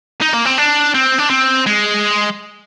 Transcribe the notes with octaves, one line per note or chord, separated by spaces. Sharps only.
D#4
A#3
C4
D4
C4
D4
C4
G#3